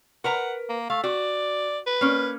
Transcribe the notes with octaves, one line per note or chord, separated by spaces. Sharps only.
A#4 B4 F#5 A#5
A#3
A3 F5
F#4 D5
B4
A#3 C#4